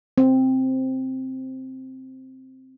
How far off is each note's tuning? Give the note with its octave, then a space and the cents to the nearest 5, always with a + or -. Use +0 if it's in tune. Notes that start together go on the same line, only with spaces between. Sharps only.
C4 +0